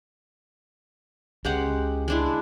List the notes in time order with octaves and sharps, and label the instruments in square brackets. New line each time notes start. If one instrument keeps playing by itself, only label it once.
[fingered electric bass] C#2 C#4 [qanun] G#3 G4 F#5
[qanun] G#3 D4 E4